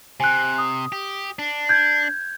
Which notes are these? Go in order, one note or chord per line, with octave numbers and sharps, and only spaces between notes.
C3 G#5 F#6
D#6
G4
D4
G6 G#6